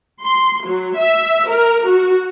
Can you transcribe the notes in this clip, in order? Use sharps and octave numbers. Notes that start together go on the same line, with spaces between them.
C6
F#3
E5
A#4
F#4